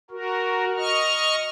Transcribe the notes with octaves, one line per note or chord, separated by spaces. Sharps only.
F#4 A#4
D#5 C#6 F6